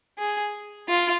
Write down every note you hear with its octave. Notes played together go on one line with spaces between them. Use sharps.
G#4
F4